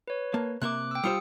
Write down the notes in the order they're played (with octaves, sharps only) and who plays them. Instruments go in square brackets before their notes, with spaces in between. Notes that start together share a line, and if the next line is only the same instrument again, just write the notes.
[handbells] B4 C#5
[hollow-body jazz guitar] A#3 A5
[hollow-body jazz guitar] C3 A#3 E5 [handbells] D6 F#6
[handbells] G5 E6
[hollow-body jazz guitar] G3 F4 C5 [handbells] D#6 C#7